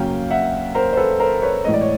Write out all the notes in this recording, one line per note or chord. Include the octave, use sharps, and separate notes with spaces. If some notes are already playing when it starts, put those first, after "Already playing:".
Already playing: F#2 C#3 F#3 A#3 C#4 F5 G5
E5 F#5
A#4 C5
C5
A4 B4
A#4 C5
B4 C#5
A2 E3 G#3 D#5
D5
C#5